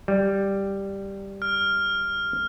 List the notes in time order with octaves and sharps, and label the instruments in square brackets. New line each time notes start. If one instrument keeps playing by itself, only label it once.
[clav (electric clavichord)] G3
[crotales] F6